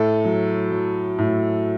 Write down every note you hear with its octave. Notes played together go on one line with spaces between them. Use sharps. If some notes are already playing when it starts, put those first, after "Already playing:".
Already playing: A2 A4
F#3
F#3
A2